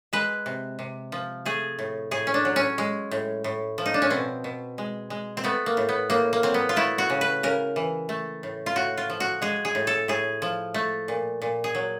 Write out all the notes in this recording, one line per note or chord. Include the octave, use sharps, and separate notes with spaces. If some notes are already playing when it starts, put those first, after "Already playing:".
G#3 B4
C3
C3
F3
A3 G#4
A2
A2 G#4
C#4
D4
F#3
C#4
G#3
A2
A2
F3
D#4
D4
C#4
B2 C4
B2
G#3
G#3
C4
A3 B3
A#3
A2
B3
A2 A#3
A#3
F#3 C4
B3
F4
A3 E4
F#4
C#3
B4
C#3 A#4
E3
A3
A2
F4
A2 F#4
F4
F3
F#4
G#3 G#4
G#4
A2
A4
A2 G#4
F3
A3
A#2
A#2
G#4
F#3